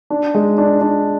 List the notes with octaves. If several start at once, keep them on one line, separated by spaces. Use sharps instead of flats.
D4
G#3
D4
D4